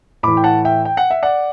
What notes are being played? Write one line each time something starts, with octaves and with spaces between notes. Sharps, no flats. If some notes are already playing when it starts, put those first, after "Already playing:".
A2 E3 B5 D6
G5
F#5 A5
E5 G5
G5
F#5
E5
D5 F#5